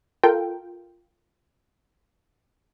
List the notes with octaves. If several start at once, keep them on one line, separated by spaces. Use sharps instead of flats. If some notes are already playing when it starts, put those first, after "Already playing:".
F4 A4 A#4 G5